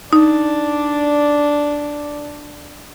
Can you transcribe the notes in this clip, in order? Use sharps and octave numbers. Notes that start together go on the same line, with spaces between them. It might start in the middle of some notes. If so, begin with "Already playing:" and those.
D4 D#4 D5